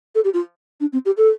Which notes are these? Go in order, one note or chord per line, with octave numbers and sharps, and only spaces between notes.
A4
G4
F4
D4
C4
G4
A4